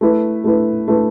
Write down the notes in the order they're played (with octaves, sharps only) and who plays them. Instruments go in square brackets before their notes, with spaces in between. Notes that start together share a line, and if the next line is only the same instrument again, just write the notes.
[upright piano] A3 E4 B4
A3 E4 B4
A3 E4 B4